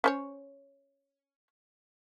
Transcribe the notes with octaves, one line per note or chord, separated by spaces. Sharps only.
C#4 C5 C#5